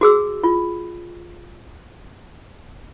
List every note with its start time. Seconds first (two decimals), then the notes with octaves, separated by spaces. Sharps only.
0.01 F#4 G#4 E6
0.44 F4